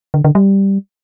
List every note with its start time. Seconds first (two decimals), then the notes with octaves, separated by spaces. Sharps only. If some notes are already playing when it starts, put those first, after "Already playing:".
0.14 D3
0.24 D3
0.35 G3